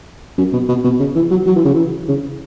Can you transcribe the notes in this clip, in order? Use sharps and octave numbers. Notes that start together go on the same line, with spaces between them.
F#2
B2
B2
B2
C#3
E3
F#3
F#3
E3
C#3
E3
C#3